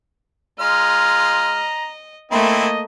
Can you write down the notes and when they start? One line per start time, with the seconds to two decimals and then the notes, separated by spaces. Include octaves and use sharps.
0.60 G#3 F4 D#5 A#5 F6
2.31 A3 A#3 C4 E4 D#5